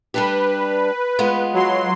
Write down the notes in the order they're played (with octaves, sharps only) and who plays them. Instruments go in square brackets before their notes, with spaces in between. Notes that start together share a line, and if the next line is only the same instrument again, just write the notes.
[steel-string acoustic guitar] G3 D4 G4 [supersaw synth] B4
[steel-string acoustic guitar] G#3 B3 F4
[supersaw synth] F#3 C6